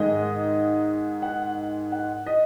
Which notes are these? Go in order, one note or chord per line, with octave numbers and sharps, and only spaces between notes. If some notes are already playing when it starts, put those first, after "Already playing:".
Already playing: G#2 D#3 G#3 D#5
F#5
F#5
D#5